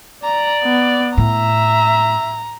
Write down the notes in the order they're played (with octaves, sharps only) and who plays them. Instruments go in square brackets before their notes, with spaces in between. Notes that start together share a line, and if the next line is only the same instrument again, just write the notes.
[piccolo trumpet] D5 [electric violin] A#5
[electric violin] B3
[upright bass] A2 [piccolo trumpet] E5 [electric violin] A#5